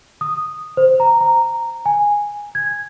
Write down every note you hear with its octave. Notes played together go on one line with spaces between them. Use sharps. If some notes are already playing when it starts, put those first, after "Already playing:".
D#6
C5
A#5
A#5
G#5
G#6